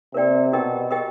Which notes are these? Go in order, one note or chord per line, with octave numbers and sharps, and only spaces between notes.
C3 A#4 D5 G5
B2 G4 A#4 D#5 G5
G4 A#4 D#5 G5